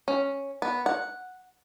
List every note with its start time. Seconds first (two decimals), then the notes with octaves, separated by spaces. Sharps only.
0.08 C#4
0.62 B3
0.86 F#5